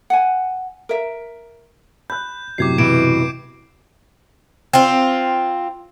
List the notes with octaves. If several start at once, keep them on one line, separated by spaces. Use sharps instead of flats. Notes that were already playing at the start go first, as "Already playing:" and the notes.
F#5 G#5
A#4 E5
B5 F#6 G6
F#2 A2 C3 D6 G#6 C7
B2 E3 G#6 D7 E7
C4 F4